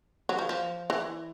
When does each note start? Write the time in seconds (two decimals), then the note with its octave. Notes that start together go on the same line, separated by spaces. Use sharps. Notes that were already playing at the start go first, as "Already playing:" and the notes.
0.29 F#3
0.39 F3
0.49 F3
0.90 E3